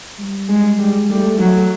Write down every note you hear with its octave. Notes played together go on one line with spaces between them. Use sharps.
G3
G#3
G3 G#3
G3 A3
F#3 A3